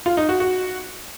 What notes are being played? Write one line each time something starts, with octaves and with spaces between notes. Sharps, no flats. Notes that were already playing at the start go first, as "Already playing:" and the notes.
F4
D#4
F#4
F#4